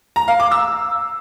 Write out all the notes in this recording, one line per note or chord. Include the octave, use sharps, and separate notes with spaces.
A#5
F5
D6
E6